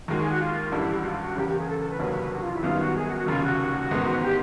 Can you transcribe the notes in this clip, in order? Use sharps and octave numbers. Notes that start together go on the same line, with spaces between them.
D#2 D#3 G#3 F#4
G#4
F#4
F4
A1 G2 D3 G3 E4
G4
F#4
F4
F#4
F#1 E2 C#3 G4
G4
G#4
A4
A4
B4
F1 D#2 D3 F#3 A#3
F#4
F4
E4
G#1 F#2 D#3 G3 B3 F4
F#4
G#4
F#4
F#4
F1 D#2 C#3 F4
F#4
A1 G#2 D#3 G#3 B3
G4